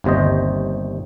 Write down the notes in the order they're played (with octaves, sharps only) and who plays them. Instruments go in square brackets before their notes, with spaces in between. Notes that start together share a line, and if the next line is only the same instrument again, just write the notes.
[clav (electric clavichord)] G1 D#2 C3 C5 D#5